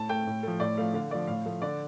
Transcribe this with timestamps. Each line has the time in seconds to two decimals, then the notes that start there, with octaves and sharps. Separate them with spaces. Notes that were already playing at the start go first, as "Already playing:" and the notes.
Already playing: A2 A5
0.09 A3 G5
0.27 A2
0.43 F3 A3
0.60 A2 D5
0.77 F3 A3 F5
0.94 D3 F5
1.11 F3 A3 D5
1.27 A2 F5
1.45 F3 A3
1.62 D3 D5